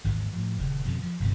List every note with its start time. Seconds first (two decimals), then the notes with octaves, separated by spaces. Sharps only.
0.04 G#1 D#2 D#3 E3
0.33 A2 F3
0.58 D#1 C#3
0.85 F2 B2 D3
1.02 F3
1.20 G1 C2 G2 A#2